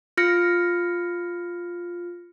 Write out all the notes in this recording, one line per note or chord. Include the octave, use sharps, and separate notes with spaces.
F4 F6 A#6 C#7